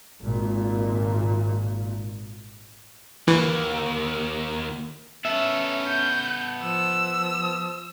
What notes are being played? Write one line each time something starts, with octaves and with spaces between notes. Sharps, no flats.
G#1 A#2
D#2 E3 A#3
B3 C#4 A4 E5
G6
F3 E6